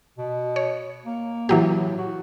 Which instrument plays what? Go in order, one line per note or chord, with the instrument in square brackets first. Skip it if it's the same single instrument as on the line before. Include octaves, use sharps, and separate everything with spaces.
[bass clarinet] B2
[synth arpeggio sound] C#5
[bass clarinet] A#3
[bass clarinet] A2 [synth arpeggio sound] E3 F#3 G4
[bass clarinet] F#4